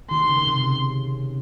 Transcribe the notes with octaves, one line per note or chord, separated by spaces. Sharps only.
D#3 C6
C#3
C3
C#3